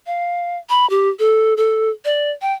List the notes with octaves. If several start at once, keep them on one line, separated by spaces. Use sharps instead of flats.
F5
B5
G4
A4
A4
D5
G5